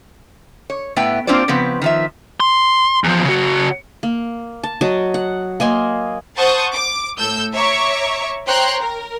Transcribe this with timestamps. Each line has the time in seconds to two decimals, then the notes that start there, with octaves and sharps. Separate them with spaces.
0.70 C#5
0.96 A2 A3 B3 B4 G5
1.27 A#3 C4 D4 F4 C5 D5
1.48 C#3 F3 B3 C4 B4
1.82 D#3 F3 E5
2.40 C6
3.04 E2 F3
3.25 C#3 F#4
4.03 A#3
4.63 A5
4.81 F#3 D#5 A5
5.14 F#5
5.60 A#3 D#5 G#5 C6
6.37 C5 F#5 A5 C#6 D#6 G6
6.73 D6
7.18 A2 A4 E6 G6
7.54 C#5 E5 A#5 C#6 D6
8.47 C5 C#5 G5 A#5 C6 F#6
8.80 A#4